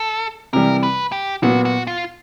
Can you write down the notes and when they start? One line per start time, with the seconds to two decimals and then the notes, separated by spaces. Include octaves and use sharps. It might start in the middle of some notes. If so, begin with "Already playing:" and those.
Already playing: A4
0.53 C3 E3 G3 A#4
0.83 B4
1.12 G4
1.42 A#2 F#3 B3 F#4
1.65 F#4
1.87 F4